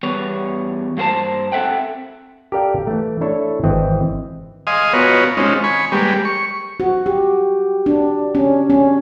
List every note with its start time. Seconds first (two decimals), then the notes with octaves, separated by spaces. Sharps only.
0.03 E2 G3 B3 C#5
0.97 G2 A#3 F#4 C5 A5
1.52 C4 A4 E5 F#5 G5
2.52 G4 A4 A#4 D5 F5 G5
2.87 E3 A3
3.21 D4 E4 A4 C#5
3.63 G#1 E3 C4 D#5
4.67 D#5 F5 G#5 C6 D#6
4.93 B3 F4 F#4 A#4 B4 C#5
5.37 G#3 C4 C#4 D#4 F4
5.64 G#5 B5 C#6
5.92 G3 G#3 A#3 G4 B4
6.25 C#6
6.80 F#4
7.06 G4
7.86 D4
8.35 C#4
8.70 C#4